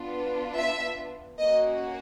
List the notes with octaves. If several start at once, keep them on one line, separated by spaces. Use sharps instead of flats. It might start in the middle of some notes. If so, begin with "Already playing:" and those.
Already playing: B3 D4 F4
E5
A#3 C#4 F#4 D#5